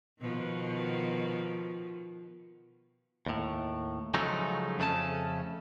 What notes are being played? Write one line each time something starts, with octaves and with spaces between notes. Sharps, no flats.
B2 D#3 F3
D#2 A2
C#3 F3 F#3 G#3 A3 D#4
F2 C#3 A3 C#4 A5